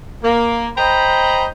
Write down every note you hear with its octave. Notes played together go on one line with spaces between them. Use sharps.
A#3
C5 D#5 G5 A#5 B5